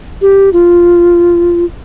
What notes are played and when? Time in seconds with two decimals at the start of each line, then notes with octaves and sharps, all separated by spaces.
0.22 G4
0.53 F4